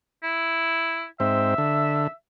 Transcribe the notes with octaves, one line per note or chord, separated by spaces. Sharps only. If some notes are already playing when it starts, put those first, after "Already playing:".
E4
G#2 C4 E5
D3